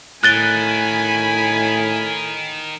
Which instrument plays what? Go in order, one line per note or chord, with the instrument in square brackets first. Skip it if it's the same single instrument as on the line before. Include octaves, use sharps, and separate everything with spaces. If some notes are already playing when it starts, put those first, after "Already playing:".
[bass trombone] A2 [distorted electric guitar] D#3 [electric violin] G#5 B5 [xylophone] F#6 A6 G7